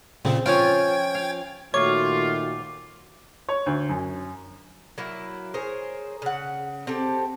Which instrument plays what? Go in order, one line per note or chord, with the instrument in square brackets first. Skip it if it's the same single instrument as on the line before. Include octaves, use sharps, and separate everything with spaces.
[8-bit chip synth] A#2 C#3 [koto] C4
[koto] F3 C#4 F4 [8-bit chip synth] G5 G#6
[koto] F5
[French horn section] A#2 D#3 F#4 [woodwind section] A3 F4 [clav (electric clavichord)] C#5 [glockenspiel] D6
[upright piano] C#5
D2
F#2
[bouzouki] F#3 A#3 E4
G#4 A#4 C5 C#5
C#3 F#5
C4 G4 A4